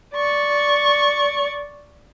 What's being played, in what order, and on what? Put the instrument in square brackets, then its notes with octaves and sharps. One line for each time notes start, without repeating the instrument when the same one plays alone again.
[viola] D5 C#6